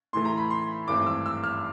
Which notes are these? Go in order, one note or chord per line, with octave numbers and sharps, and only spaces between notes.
A2 E3 A3 C6
A#5
B5
C6
G#1 G2 E3 A3 C4 D6
E6
E6
F6